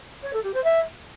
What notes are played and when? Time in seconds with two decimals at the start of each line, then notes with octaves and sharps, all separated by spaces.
0.22 C#5
0.33 A4
0.43 G4
0.53 C5
0.64 E5